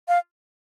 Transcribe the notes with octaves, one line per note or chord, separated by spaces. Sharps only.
F5